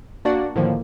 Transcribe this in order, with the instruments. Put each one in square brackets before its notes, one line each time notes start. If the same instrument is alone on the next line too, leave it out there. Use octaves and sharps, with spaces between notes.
[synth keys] A#3 D4 F#4 D5 F#5
A2 D3 D#3 F3 A#3